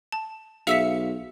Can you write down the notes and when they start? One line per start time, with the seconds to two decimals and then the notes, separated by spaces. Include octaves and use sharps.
0.12 A5
0.67 B1 G#4 E5 F5 E6 B6 C#7